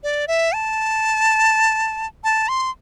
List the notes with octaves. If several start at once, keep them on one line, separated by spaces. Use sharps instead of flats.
D5
E5
A5
A5
C6